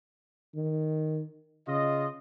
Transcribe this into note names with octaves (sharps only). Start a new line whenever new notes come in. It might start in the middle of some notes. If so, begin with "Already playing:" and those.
D#3
C#3 F4 D#5